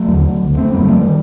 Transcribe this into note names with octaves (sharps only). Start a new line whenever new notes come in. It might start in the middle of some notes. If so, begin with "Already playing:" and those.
Already playing: F#3 A3
D#2 D3
D2 D3
A3 C4
F#2 D3 G3 A#3
F#3 A3
D#3 G3